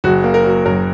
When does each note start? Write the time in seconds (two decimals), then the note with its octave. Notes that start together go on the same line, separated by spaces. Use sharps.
0.04 F#1 F#4
0.24 A#3
0.34 A#4
0.45 F#3
0.65 F#2 A#4